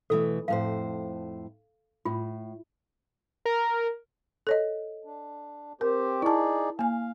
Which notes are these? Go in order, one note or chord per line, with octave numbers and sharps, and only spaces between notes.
B2 E3 A3 A4
F2 A2 C5 F5
A2 F4
A#4
A4 C#5 D#5
D4
C4 G4 A#4 C5
D#4 E4 G#4 D5 A5
A#3 F5 G#5